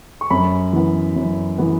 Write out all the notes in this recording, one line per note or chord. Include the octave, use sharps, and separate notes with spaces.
C#6
F#2 B5
E3 B3
F#2
E3 B3